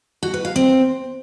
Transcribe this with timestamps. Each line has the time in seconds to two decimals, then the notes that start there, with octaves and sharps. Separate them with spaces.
0.23 F#4
0.34 B4
0.45 F5
0.56 C4